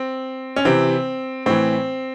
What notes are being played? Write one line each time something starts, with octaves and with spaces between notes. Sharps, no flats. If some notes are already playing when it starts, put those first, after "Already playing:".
Already playing: C4
C#4
C3 E3 C4
A2 E3 C4